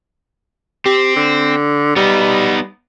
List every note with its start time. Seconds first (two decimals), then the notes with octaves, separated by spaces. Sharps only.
0.86 C4 G4
1.16 D3
1.96 G3 B3 D#4